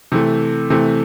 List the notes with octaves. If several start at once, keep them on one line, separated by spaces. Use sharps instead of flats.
C3 E3 A3
C3 E3 A3